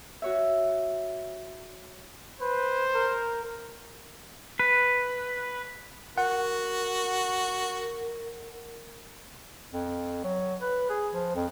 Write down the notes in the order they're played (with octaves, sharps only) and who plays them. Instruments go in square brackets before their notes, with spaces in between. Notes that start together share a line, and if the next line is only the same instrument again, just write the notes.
[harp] F#4 C#5 E5
[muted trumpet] B4 [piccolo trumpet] C5
[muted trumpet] A#4
[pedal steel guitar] B4
[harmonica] F#4 [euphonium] A#4 [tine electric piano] F#5
[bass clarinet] F2
F#3
B4
G#4
F3
F2